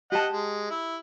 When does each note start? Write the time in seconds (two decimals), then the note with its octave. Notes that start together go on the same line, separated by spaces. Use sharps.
0.12 G4 D#5 F#5 A5
0.32 G#3
0.71 E4